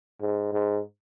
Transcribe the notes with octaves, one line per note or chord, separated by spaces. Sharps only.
G#2
G#2